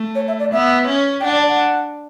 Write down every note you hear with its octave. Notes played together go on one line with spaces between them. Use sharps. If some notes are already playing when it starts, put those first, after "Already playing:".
Already playing: A3
C#5
E5
D5
B3 E5
C#4
G5
D4 F#5
D5
F#5